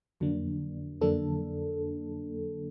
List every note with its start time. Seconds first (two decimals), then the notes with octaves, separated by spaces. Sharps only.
0.20 F2 D3 F#3 A#3 D4
1.01 F2 D3 F#3 A#3 D4 A4